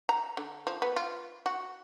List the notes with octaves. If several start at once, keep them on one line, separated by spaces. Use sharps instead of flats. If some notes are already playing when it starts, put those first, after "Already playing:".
A#5
D3
F3
B3
F4
F#4